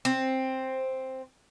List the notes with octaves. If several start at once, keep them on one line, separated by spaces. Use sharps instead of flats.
C4